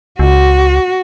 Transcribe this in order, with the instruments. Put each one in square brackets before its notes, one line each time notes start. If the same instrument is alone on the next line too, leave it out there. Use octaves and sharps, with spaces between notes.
[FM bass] C#2 [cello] F#4